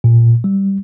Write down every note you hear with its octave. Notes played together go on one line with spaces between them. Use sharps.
A#2
G3